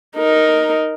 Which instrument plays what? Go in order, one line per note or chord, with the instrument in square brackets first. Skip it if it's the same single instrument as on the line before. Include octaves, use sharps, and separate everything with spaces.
[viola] D#4 A#4